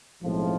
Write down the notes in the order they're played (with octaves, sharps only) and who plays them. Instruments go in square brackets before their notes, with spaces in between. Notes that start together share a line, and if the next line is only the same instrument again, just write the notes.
[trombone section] B1 A2 F3 G#3 C4